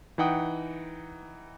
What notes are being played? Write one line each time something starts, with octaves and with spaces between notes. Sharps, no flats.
E3 D#4 F#5 G5 D#6